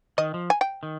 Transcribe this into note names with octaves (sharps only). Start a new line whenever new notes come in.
D#3 D#5
F3
G#5
G5
D#3